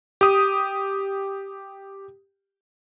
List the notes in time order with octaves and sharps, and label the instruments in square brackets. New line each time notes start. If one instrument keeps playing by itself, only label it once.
[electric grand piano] G4 D#6